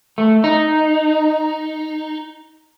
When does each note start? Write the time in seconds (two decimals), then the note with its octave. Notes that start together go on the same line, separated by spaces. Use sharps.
0.18 A3
0.44 D#4